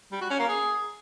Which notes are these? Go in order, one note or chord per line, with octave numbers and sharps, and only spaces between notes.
G3
F#4
C#4
A#3
G#4